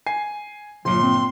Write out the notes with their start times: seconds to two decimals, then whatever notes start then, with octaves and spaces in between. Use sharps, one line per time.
0.06 G#5 C7
0.85 G1 A#2 F#3 C6
1.02 C4